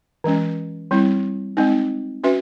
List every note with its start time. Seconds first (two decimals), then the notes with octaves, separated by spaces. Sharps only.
0.24 E3 G#3 C#4
0.91 G3 C4 E4
1.57 G#3 C4 D#4
2.24 C#4 F#4 B4 E5